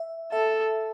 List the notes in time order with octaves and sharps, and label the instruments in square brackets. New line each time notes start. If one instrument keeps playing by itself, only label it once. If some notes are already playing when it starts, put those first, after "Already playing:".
Already playing: [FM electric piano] E5
[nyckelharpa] A4 [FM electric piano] E5